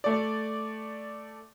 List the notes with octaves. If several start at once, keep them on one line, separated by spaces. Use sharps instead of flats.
A3 D5